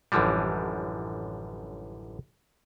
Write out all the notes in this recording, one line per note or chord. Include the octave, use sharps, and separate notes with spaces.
A1 F#2 D3 E3 F3 G3